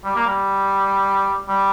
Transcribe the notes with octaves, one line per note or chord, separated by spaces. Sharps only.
G3
A#3
G3
G3